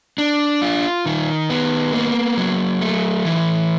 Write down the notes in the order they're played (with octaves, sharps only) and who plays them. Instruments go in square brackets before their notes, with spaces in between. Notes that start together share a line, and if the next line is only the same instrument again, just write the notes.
[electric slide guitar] D4
F4
D#3
B3
A#3
F#3
A3
E3